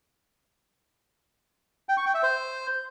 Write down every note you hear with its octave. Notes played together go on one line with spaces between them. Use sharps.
G5
C#6
G5
E5
C5